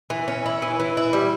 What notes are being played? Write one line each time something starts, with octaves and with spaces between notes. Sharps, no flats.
E3
C#4
E4
E3
E3
E4
G3